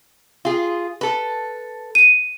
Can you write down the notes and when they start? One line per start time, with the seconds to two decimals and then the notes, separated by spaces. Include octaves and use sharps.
0.45 F4 G#4
1.01 A4 B4
1.95 D#7